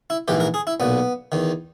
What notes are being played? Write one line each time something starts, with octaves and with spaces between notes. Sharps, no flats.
E4
A#1 G#2 E3 G4
A#4
G#4
E4
B1 A#2 B3
E2 D#3